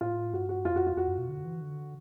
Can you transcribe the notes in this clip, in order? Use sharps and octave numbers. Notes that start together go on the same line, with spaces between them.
A2 F4
G2 F#4
F#4
F2 F4
F#4
F4
F2 F#4
F#2
B2
D3
E3
D3